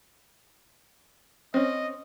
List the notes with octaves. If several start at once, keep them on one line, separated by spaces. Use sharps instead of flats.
C4 C#4 D#5